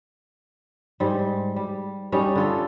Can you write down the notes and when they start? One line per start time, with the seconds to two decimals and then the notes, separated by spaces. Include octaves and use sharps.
1.00 G#2 G3
1.56 G3
2.12 G3 C#4 D#4
2.36 D3 F4 A4